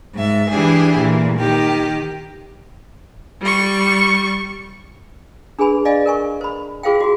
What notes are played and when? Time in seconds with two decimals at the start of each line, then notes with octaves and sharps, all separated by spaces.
0.15 G#2 E5
0.51 E3 D4 E4 G4 G#4
0.99 A#2 E3
1.38 D#3 G4
3.41 G3 C#6
5.59 D4 G#4 B4 G#5 B5
5.85 D5 D#5 F5 G#5
6.06 A#4 G#5 C#6
6.41 C5 B5
6.83 F4 G#4 C5 F5 G5
7.01 F#4 G#4